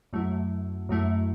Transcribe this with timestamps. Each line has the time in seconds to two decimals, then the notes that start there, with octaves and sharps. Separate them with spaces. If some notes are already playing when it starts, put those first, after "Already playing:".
0.13 F#2 F#3 A3 E4
0.89 F#2 F#3 A3 E4